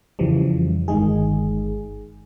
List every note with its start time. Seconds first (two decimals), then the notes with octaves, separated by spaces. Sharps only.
0.19 F2 C#3 E3 F3 G3
0.88 G1 D#3 G#3 G#4